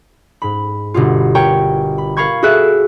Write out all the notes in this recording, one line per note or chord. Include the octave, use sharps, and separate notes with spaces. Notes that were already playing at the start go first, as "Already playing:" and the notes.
G#2 B5
G1 B2 F4
A#4 C#5 G5 A#5 C#6
B5
A#4 F5 B5 C#6 G#6
F#4 G#4 A4 E5 F#6